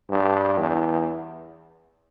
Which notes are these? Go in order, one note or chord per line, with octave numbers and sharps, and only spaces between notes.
G2
E2